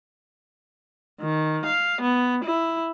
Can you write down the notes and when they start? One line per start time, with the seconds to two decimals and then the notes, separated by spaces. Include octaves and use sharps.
1.21 D#3
1.66 F5
2.02 B3
2.45 E4